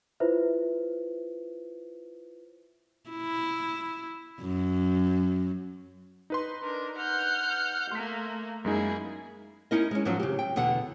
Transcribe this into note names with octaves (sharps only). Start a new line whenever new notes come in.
E4 F4 B4 C5 E5
E4
F#2
D#4 B4 C6
D4 A#4
F#5 F6 G6
A3 A#3 C6 B6
F#2 G#3 A#3 D#4 E4 G#4
C#4 D#4 E4 A#4 D#5
G#3 C#4
G#2 F3 F#3 C#4 E4
C#3 G4
G5
E2 B2 D3 F#5